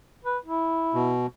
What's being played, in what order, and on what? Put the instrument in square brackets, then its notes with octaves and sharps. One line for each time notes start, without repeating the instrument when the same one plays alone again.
[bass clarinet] B4
E4
[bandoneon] B2